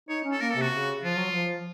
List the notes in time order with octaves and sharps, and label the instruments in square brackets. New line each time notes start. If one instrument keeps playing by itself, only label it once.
[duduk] D#4 [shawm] C#5
[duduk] C#4
[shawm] A4
[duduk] A#3 [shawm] A#4
[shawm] A4
[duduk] C3
[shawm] F#4
[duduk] C#3
[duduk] F3 [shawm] F4
[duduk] F#3
F3